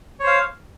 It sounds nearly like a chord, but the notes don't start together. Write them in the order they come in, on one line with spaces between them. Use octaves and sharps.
C#5 C5 F5